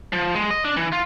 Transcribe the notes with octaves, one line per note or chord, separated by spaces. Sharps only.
F3
G#3
D#5
D4
E3
F4